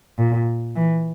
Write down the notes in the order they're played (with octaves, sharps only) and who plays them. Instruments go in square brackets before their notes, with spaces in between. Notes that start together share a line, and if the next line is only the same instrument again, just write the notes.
[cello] A#2
E3